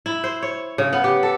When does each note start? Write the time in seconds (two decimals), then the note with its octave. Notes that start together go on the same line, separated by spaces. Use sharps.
0.06 E4
0.24 C5
0.42 C#5
0.78 C#3
0.93 B3
1.04 G4
1.23 A4